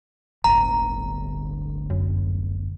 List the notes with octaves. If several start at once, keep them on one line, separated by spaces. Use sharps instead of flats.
D1 G1 A#5
F#2